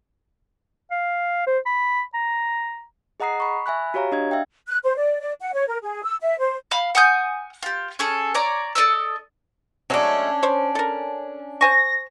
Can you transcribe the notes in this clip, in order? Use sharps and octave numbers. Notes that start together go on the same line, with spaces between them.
F5
C5
B5
A#5
G#4 D#5 F#5 A#5 D#6 C7
B5 C#6
E5 G#5 B5 F#6
F#4 G4 C#5 F5 A#5
D4 D#5 G#6
E5 F5 G5
F#6
C5
D5
D5
F#5
C#5
A#4
G#4
E6
E5
C5
F5 B5
F#5 G#5 D#6 G6
F4 G4
C#4 G#4 A4
C#5 D5 A#5
A4 D5 D#5 E6
F#3 G#3 A3 C#4 D4
C5 C#5
A4 A#4
C5 G#5 C#6 A#6